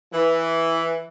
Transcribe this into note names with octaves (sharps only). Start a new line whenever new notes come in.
E3